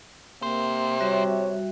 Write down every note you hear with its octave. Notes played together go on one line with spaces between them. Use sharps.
C2 C3 A#3 C5
G3 F#4 C#5 E5